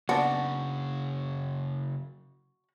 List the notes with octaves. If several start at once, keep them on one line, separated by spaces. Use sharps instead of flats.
C#3 F#3 B3 D4 F#4